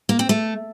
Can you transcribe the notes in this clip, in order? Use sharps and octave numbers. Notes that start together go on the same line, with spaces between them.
A#3
C4
A3